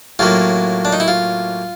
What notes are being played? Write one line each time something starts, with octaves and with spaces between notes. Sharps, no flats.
A2 F#3 A#3 F4
D4
D#4
E4
F4